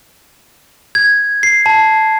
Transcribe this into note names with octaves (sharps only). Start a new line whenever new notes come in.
G#6
C7
A5